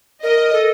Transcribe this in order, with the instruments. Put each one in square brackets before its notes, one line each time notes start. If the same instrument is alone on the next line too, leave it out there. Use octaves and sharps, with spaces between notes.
[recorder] A#4 [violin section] D#5
[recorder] A4